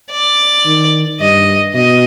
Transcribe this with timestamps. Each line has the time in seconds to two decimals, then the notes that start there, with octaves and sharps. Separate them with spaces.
0.11 D5
0.65 D#3
1.20 G2 D#5
1.74 B2 D#5